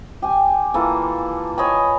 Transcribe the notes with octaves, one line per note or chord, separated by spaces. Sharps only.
G4 G#5
E3 A#3 F4 A4
C#5 D#5 G#5 B5